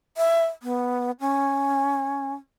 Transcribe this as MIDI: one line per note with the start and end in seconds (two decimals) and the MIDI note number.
0.17 0.46 76
0.63 1.11 59
1.20 2.33 61